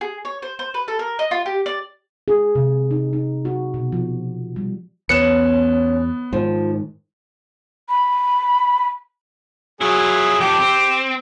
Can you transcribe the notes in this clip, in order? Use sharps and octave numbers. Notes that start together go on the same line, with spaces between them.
G#4
C#5
C5
C5
B4
A4
A#4
D#5
F4
G4
D5
G#4
C3
D#4
D#4
F#4
B2
F3
G3
E2 B3 C#4 F#6 C#7 E7
G#2 D#3 F3
B5
F#3 E4 F4 G#4
F2 D4 G4
C4